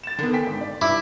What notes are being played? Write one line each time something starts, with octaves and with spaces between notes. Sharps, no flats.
A6 E7
D3 D#3 B3
G5 G#5 B6
G#1
D5
G2 E4 D6